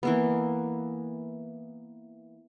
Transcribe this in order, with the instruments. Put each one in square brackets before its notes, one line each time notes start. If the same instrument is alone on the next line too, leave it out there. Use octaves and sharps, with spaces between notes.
[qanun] E3 A#3 B3